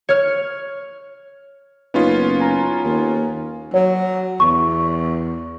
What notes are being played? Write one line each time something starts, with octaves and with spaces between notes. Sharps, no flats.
C#5 F6
F#1 B3 C#4 D#4 F4
G#5 A#5
D#2
F#3 C#5
E2 C#6